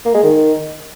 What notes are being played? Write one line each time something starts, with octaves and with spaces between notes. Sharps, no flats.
A#3
G#3
D#3